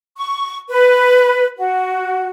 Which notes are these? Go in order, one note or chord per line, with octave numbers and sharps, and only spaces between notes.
C#6
B4
F#4